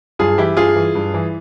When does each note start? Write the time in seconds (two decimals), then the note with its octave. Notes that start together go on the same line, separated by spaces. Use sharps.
0.19 G2 F4 G#4
0.38 E3 E4 G4
0.57 G2 F4 G#4
0.76 E3
0.95 G2
1.14 E3